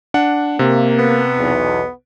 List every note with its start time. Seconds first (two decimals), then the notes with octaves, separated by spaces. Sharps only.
0.14 D4 F#5
0.59 C3 A#3
0.99 B3
1.38 B1 E2